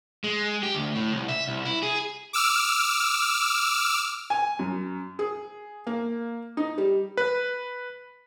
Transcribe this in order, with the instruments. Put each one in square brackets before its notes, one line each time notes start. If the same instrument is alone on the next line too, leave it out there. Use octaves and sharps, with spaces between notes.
[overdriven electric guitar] G#3
G4
D2
A2
C2
E5
C2
E4
G#4
[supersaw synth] D6 E6 F6
[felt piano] G#5
F#2
G#4
A#3
D#4
G3
[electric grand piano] B4